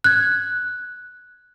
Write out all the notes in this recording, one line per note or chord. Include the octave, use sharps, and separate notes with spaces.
F#6 G#6